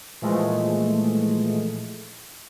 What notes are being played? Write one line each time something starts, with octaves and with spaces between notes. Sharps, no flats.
A#2 E3 F3 G#3 A3